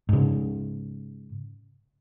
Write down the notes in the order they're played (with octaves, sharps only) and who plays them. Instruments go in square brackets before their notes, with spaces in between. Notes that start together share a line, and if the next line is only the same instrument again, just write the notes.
[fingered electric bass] G#2 C#3